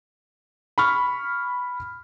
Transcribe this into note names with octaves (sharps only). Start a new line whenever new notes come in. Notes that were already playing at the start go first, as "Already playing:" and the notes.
B5 C#6 F6